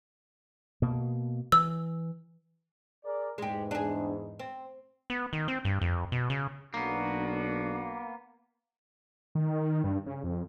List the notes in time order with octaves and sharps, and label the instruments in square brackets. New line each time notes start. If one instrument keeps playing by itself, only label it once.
[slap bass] B2 A#3
[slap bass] E3 [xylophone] E6
[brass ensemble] G#4 A#4 D5
[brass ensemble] E2 G#2 [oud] G#3 G4
[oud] D4 G#4
C4
[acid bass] B3
D#3
C4
G2
F2
B2
C#3
[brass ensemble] B1 D4 F#4 [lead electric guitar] A#3 B3
[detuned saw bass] D#3
G2
C#3
F2